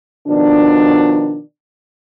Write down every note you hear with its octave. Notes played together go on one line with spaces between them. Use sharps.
B2 D#3 F3 D4